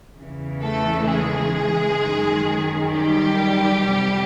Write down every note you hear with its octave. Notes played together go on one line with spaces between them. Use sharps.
E2 C#3 E3
A3 A4
G#3 G#4
F#2 D#3
G3 G4
F2 C3 E3